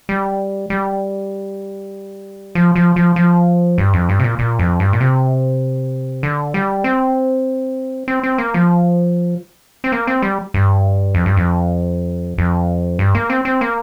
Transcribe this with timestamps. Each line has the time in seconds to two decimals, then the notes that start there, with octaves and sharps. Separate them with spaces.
0.09 G3
0.70 G3
2.55 F3
2.76 F3
2.96 F3
3.16 F3
3.78 G2
3.93 F2
4.09 G2
4.19 C3
4.24 A#2
4.39 A#2
4.59 F2
4.80 G2
4.93 A#2
5.00 C3
6.23 D3
6.54 G3
6.84 C4
8.08 C4
8.24 C4
8.38 A#3
8.54 F3
9.84 C4
9.92 A#3
10.07 C4
10.22 G3
10.54 G2
11.14 F2
11.26 G2
11.37 F2
12.38 F2
12.99 G2
13.15 A#3
13.30 C4
13.45 C4
13.61 A#3